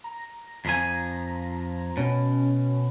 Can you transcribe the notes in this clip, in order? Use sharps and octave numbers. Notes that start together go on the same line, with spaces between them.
A#5
F2 F3 G#5
B2 C#4